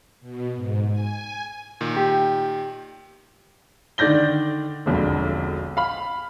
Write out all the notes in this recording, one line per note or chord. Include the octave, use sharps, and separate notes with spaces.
B2
G#2
G#5
A#2 D#3
G4
D3 D#3 D5 G6 A#6 G7
E1 B1 F2 D3
F5 B5